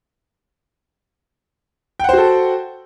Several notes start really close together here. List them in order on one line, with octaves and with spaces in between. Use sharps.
G5 F#5 C5 F#4 A4